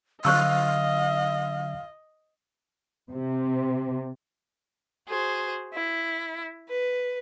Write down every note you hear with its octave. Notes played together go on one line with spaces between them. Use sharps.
D3 F#3 C5 D#5 F5 C#6 E6
C3
F#4 G#4 C5
E4
B4